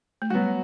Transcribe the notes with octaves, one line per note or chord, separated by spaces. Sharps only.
A3
F#3 G3 B3 F#4